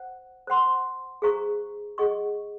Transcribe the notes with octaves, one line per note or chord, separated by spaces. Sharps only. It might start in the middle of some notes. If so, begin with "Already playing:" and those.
Already playing: C5 F#5
C5 F#5 C6
G#4 C5 F5 A#5 C#6
G#4 D#5 F#5 C#6